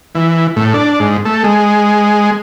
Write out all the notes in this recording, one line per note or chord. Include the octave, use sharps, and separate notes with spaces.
E3
A2
D4
G#2
A3
G#3